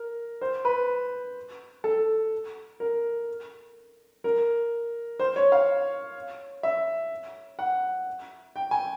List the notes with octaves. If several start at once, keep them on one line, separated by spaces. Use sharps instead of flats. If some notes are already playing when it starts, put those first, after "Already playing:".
Already playing: A#4
C5
B4
A4
A#4
A#4
C5
C#5
F5
E5
F#5
G5
G#5